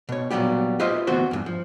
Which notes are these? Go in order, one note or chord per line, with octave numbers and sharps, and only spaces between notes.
B2 C#5
A#2 F#3 G3 B3 G4
F4 G4 B4 C5 D#5 E5
D2 E3 B3 C4 F#4 C5
E2 G2
F3